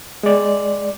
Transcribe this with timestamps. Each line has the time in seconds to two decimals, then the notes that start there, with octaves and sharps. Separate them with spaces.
0.23 G#3 D5